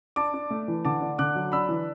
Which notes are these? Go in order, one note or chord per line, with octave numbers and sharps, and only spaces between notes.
D4 A5 D6
D4
A3
E3
D3 A5 D6
D4
D3 D6 F#6
F#3
D4 B5 E6
E3